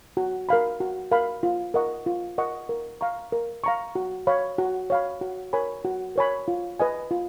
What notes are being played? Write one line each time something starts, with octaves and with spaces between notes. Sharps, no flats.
F#4
A#4 F5 B5
F#4
A#4 F5 B5
F4
A#4 D#5 F#5 C#6
F4
A#4 D#5 F#5 C#6
A#4
F5 A#5 C#6
A#4
F5 A#5 C#6
F#4
C#5 F5 B5
F#4
C#5 F5 B5
F#4
A#4 C#5 G#5 B5
F#4
A#4 C#5 G#5 B5
F4
B4 D#5 G#5
F4